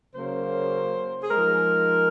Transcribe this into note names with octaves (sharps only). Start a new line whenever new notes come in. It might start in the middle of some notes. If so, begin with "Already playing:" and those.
C#3 F#3 A#3 C#4 C5
G#4
F3 G#3 D#4 A#4